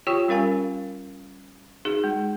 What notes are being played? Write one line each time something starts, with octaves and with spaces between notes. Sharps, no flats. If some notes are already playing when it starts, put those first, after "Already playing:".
F4 G4 C#5 G5 C#6
G3 C#4 A#4 F5 G#5
D#4 F#4 G#4
G#3